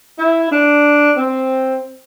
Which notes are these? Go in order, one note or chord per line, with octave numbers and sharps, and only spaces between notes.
E4
D4
C4